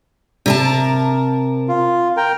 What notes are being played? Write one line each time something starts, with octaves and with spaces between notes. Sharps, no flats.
C3 A#4 A5
F4
A#4 G5